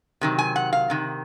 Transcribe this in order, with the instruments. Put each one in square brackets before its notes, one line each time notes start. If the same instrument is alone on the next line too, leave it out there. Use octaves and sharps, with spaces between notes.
[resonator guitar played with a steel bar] C3 D#3 F#3
G#5
F#5
F5
C3 D#3